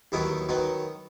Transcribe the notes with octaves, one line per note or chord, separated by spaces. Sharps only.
D#2 D#3 F#3 B3 E4
D#3 F#3 B3